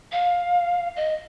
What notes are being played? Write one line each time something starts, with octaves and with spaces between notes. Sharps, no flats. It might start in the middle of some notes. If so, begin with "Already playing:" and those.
F5
D#5